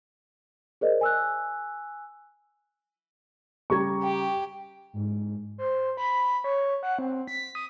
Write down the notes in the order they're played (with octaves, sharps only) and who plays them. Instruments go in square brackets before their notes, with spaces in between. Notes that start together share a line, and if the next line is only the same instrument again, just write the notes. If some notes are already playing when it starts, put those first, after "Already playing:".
[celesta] G#4 A#4 C5 D5 D#5
G#5 E6 F#6
[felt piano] C#3 G3 G#6 [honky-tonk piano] A#5 C#6
[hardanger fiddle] G4 [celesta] G5
[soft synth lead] G#2
C5
B5
C#5
F#5
C4
B6
D#6